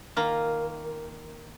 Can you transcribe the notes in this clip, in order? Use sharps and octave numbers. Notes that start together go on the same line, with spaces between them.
D#3 A#3 F4